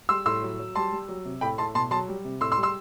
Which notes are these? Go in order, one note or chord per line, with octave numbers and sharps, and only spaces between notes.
G3 C6 E6
A2 C6 E6
F#3
F#3
G3 A5 C6
G3
F#3
C3
A2 G5 B5
A2 A5 C6
B2 A5 C6
F#3 A5 C6
G3
C3
A2 C6 E6
C6 E6
G3
C6 E6